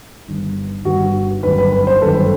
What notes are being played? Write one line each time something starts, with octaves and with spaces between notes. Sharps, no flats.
G1 G2 D#3
G1 G2 D#3 F#4
G1 F#2 D#3 B4
B4
B4
C5
G1 F#2 D#3 A4
B4